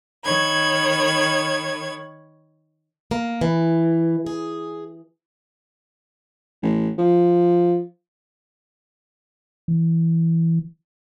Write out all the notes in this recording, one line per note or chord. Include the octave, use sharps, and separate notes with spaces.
D#3 C#5 B5 G#6
A#3
E3
G#4
A1
F3
E3